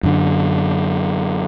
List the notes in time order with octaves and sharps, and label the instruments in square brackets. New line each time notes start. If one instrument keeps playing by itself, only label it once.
[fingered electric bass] F#2 D3